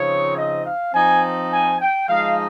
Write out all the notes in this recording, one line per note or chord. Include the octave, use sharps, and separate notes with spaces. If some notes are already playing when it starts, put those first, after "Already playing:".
Already playing: C#3 F3 C4 D#4 C#5
D#5
F5
F3 C4 D#4 G#5
G#5
G5
F3 G#3 D#4 F5